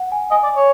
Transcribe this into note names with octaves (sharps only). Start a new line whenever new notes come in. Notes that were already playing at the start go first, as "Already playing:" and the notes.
Already playing: F#5
G#5
D#5 G#5
D5
C#5